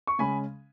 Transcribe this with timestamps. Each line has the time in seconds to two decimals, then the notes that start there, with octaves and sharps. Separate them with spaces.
0.07 C#6
0.19 C#3 G#3 C#4 G#5 B5